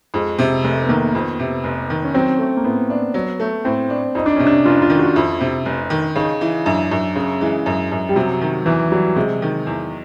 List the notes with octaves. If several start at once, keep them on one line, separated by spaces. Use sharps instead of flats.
F2 G#3
C3
F1 A3
B3
D#3 A#3
F2 B3
C3
F1
D#3
C#4
F#3 C4
A3
A#3
A2 B3
D4
F#3
A3
A2 C4
D4
F2 D#4
D4
C3 C#4
D4
F1 F4
F4
D#3
F#4
F2 E4
C3
F1
D#3
C#3 D#4
E3
F#2 D4
F#2
C#3 C#4
E3 G#3
F#2
F#2
G3
C3 F#3
D#3
E2 E3
F#3 G3
C3 G#3
D#3
E2